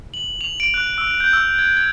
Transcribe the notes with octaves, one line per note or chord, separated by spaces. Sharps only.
F#7
F7
D7
F#6
E6
G6
E6
G#6
G#6